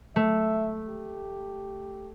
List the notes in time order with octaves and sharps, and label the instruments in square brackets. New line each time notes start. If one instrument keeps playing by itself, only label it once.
[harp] A3 [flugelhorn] E5
[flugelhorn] G4